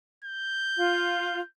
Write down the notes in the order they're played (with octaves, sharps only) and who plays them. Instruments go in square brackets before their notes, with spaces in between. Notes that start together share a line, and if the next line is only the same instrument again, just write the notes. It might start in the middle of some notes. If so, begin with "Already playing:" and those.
[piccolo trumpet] G6
[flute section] F4